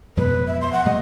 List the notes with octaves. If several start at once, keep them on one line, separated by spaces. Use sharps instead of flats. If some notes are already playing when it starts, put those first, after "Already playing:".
F2 B2 G#3 B4
E5
C6
F#5
A#2 G3 A3 D#5